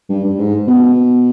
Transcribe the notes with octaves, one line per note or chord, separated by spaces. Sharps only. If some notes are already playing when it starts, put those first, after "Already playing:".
G2
G2
G#2
B2
B2